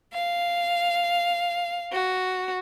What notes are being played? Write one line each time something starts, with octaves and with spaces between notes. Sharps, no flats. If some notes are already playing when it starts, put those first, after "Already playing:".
F5
F#4